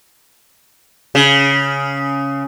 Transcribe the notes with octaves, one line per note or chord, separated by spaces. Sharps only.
C#3